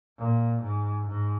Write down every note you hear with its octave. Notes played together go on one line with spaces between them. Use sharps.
A#2
G#2
G#2